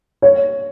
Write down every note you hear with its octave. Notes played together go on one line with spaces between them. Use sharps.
C#5